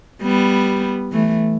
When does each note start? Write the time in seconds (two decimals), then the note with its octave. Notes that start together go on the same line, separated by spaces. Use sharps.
0.22 G3 B3
1.12 E3 A3